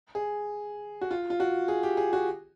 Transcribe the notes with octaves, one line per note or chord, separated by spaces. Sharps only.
G#4
F#4
F4
F4
F#4
G#4
G4
G#4
F#4